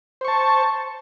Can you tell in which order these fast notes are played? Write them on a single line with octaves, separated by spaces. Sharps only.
C5 C#6 A5